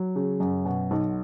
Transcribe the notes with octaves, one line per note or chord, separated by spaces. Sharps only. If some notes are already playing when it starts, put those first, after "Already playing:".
Already playing: F#3
C#3
F#2
B2
B1